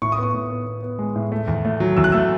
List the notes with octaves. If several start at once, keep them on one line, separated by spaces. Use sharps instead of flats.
A2 C#6
D#6
B3 C#6
A2
B3
B3
B3
G#3
A2
A3
E2
A3
F#3
E2 E6
F#6
A3 E6